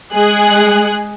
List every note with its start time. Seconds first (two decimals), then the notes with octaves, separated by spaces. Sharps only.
0.13 G#3 G#4 F#6